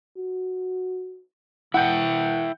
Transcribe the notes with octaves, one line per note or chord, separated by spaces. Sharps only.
F#4
E3 E4 F#5 G5 G6